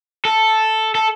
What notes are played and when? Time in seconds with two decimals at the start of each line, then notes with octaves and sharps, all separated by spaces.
0.25 A4
0.95 A4